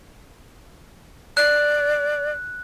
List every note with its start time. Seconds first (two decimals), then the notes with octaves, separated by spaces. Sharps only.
1.37 D5 F#6